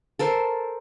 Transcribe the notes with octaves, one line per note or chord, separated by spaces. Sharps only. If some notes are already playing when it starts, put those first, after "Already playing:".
A4 A#4 C5